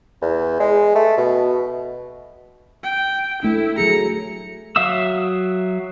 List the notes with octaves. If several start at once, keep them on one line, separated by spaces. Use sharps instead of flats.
E2
G#3
A3
B2
G5
A3 D4 E4
F#3 G#4 A#5 C#7
F#3 E5 F5 D#6 E6